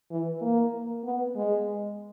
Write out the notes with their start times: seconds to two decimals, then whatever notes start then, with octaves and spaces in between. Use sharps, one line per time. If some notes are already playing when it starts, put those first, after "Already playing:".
0.11 E3
0.42 A#3
1.05 B3
1.36 G#3